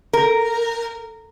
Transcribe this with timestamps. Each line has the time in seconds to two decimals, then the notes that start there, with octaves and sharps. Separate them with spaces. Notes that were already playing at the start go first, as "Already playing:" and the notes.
0.13 A#4